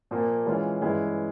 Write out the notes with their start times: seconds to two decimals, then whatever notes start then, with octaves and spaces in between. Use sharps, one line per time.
0.11 A#2 F3 A#3
0.46 E3 G#3 C#4 F4
0.81 G2 E3 G#3 C#4 E4